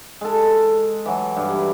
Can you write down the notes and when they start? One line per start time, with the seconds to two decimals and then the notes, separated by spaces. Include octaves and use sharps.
0.21 G#3 A4
1.06 E3 F#3
1.36 G2
1.54 E4